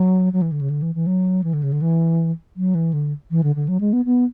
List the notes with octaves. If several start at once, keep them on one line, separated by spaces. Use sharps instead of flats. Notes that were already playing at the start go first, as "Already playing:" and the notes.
Already playing: F#3
F#3
E3
D3
C#3
D3
E3
E3
F#3
E3
D3
C#3
D3
E3
F#3
E3
D3
E3
D3
D3
F#3
G#3
B3
B3